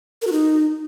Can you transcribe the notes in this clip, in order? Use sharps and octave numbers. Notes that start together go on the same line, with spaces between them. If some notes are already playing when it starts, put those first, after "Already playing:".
A#4
F#4
D#4